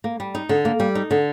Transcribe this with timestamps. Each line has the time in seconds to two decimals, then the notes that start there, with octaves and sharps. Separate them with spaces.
0.04 A#3
0.20 G3
0.35 D#4
0.49 D3
0.65 A#3
0.80 G3
0.95 D#4
1.11 D3